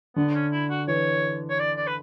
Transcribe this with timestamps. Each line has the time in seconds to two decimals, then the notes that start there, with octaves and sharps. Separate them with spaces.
0.16 D3 B3
0.34 C#4
0.52 E4
0.70 F#4
0.88 E3 C#5
1.50 C#5
1.59 D5
1.77 D5
1.87 B4